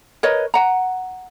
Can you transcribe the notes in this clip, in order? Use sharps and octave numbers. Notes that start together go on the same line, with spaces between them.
A#4 B4 C#5 D#5
F#5 A#5